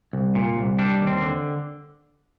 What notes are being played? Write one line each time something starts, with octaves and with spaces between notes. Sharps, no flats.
C2
A#2
C2
G3 D4
D#2
C4
D3